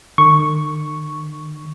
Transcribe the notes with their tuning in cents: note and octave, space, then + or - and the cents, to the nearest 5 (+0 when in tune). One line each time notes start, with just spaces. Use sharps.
D#3 -45 C#6 +0